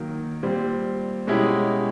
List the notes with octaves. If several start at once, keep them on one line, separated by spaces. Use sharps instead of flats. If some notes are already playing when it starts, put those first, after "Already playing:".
Already playing: D#3 F#3 A#3 D#4
A#2 G3 C4
B2 G#3 C#4 E4 G4